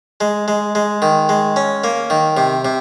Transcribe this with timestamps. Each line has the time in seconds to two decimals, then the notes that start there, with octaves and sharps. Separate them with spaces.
0.21 G#3
0.48 G#3
0.75 G#3
1.02 D#3
1.29 G#3
1.56 C#4
1.84 A#3
2.10 D#3
2.37 C3
2.65 C3